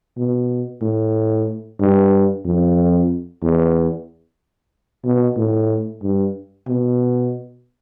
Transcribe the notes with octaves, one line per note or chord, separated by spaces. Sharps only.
B2
A2
G2
F2
E2
B2
A2
G2
B2